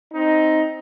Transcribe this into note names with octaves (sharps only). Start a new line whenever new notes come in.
C4 D#4